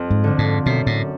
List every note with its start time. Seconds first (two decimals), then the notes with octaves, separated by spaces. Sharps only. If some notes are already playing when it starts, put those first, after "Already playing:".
Already playing: F2
0.10 G#2
0.24 D3 F3
0.38 G#2
0.66 F#2 B2
0.87 A2